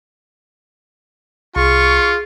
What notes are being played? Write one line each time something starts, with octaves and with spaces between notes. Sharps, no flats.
C2 F4 G#4 C#6